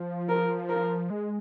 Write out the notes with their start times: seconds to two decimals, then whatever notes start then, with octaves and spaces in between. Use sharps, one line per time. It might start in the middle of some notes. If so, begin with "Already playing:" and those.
Already playing: F3
0.29 A#4
0.69 A#4
1.10 G#3